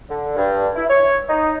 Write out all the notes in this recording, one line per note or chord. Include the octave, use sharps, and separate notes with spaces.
D3
G2
E4
C#5
D#4